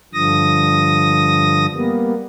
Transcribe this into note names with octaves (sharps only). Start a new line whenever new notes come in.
G2 D3 F3 D#6 A#6
G3 A#3 B3